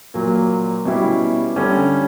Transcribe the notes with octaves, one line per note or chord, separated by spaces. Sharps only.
A#2 F#3 A#3
B2 G3 C#4 E4 G4
D3 G3 C#4